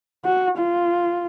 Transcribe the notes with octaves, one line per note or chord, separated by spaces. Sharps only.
F#4
F4